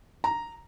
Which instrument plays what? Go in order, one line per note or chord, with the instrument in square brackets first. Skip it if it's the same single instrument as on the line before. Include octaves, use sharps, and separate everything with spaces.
[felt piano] A#5